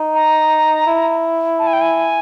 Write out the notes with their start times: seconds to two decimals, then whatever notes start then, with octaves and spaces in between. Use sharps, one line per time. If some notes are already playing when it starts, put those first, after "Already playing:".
Already playing: D#4
0.15 A#5
0.86 E4
1.59 A5
1.67 G#5
1.73 G5
1.81 G#5